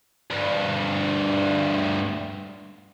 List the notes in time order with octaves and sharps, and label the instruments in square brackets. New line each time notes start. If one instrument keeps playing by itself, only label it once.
[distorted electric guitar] D2 G2